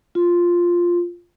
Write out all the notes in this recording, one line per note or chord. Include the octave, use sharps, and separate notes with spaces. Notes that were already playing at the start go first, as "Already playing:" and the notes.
F4